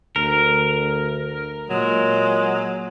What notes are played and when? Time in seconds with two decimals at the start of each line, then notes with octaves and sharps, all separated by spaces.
0.16 D2 A#4
1.70 A#2 F#3 G#3